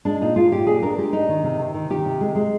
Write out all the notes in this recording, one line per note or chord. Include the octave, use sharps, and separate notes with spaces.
G#3 D4
A#2 D#4
G#3 F4
A#2 G4
A#2 G#4
D4 A#4
G#3 G4
D4 D#4
D#3
C3
C3
D#3
D#3 G4
C3
G#3
G#3